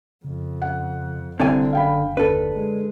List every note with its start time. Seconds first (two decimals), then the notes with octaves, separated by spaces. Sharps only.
0.24 F2 C#3
0.62 F#5
1.40 F1 C2 D3 C4 D5 G#5
1.73 F#1 F#2 F5 G5 B5
2.17 D#2 D3 A4 B4
2.54 G#3